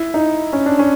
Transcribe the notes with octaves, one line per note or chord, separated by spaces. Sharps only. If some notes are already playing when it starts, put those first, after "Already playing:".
Already playing: E4
D#4
C#4
D4
C#4